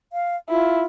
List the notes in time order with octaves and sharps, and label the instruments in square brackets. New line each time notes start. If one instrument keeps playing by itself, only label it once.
[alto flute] F5
[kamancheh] E4 [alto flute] F4